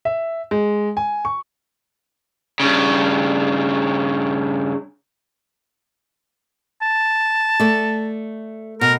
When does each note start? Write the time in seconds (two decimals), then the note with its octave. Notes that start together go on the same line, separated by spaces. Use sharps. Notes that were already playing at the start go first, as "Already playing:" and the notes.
0.05 E5
0.51 G#3
0.97 G#5
1.25 C#6
2.60 G2 C#3
6.82 A5
7.60 A3 D5
8.81 B2 A#4